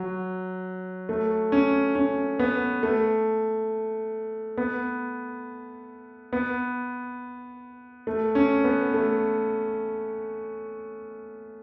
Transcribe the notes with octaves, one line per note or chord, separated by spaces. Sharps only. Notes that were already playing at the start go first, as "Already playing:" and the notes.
Already playing: F#3
A3
C#4
C#4
B3
A3
B3
B3
A3
C#4
B3
A3